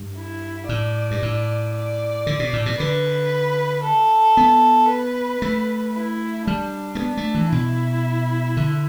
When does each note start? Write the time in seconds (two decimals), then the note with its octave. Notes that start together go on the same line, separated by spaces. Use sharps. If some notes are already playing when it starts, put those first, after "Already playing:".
Already playing: G2
0.17 E4
0.69 A2 D5
1.11 G2
1.22 A2
1.75 D5
2.27 D3
2.39 B2
2.53 A2
2.66 B2
2.79 D3 B4
3.84 A4
4.37 B3
4.90 B4
5.42 A3
5.95 E4
6.47 G3 D4
6.95 A3
6.99 B3 D4
7.17 A3
7.35 E3
7.52 B2 E4
8.57 D3